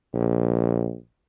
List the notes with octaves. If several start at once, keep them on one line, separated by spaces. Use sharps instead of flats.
A#1